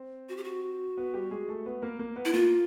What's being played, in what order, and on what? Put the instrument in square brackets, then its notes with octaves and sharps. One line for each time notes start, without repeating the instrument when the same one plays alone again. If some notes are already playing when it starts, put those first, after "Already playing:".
Already playing: [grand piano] C4 C5
[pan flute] F#4
G4
F#4
[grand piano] B3 B4
G3 G4
G#3 G#4
A3 A4
B3 B4
A#3 A#4
A#3 A#4
B3 B4
[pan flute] E4
[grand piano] A#3 A#4 [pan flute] F4